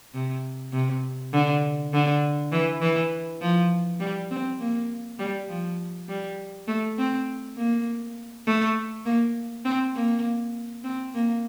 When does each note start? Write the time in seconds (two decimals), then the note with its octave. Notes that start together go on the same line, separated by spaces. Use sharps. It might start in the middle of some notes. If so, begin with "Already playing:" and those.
0.14 C3
0.73 C3
1.33 D3
1.93 D3
2.52 E3
2.81 E3
3.42 F3
4.00 G3
4.31 C4
4.60 A#3
5.19 G3
5.49 F3
6.08 G3
6.68 A3
6.98 C4
7.57 A#3
8.47 A3
9.06 A#3
9.65 C4
9.95 A#3
10.84 C4
11.14 A#3